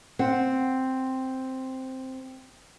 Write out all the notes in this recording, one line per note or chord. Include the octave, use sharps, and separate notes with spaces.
C4 F#5